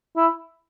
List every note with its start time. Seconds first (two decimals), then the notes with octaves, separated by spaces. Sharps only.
0.16 E4